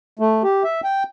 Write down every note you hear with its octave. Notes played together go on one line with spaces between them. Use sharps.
A3
G4
E5
G5